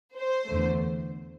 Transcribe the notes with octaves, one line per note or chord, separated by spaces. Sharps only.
C5
E2 D3 A3